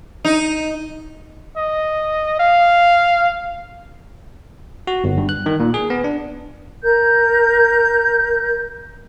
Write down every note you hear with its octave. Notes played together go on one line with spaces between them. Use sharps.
D#4
D#5
F5
F#4
G1
G2
F#6
D#3
A#2
G#4
B3
D4
A#4 G6